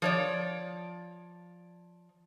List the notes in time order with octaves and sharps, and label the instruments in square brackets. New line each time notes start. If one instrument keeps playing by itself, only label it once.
[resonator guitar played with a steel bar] F3 C#5 D5